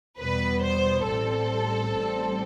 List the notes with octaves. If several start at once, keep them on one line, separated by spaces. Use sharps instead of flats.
E2 B2 G3 B3 B4
C5
A1 A2 G3 C4 A4
A1 A2 G3 C4